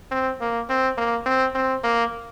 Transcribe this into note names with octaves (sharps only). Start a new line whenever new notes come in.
C4
A#3
C4
A#3
C4
C4
A#3